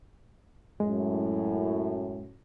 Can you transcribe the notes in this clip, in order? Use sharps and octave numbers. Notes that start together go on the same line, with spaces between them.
F#2 A2 G#3